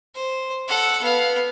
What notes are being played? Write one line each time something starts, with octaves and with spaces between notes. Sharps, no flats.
C5
A4 F#5
B3 F5